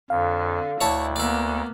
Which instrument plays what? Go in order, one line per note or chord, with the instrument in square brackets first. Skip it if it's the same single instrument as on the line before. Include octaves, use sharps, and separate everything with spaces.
[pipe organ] F2 [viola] D3 [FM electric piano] F5
[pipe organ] D2 [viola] E4 [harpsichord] C#5 E5 A5
[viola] A#3 B3 [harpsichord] D5 E5